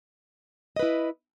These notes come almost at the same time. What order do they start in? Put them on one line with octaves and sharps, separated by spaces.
D#5 B4 E4